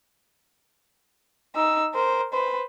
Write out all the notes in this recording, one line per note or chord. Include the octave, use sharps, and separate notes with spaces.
D#4 E6
A#4 C5
B4 C5